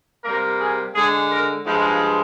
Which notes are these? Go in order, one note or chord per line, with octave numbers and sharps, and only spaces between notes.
C3 G3 A#3 A#4
G#4
D3 G#3 G#4
A#4
G2 F3 G#3